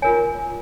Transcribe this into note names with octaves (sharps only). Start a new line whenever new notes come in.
F4 A#4 C#5 G#5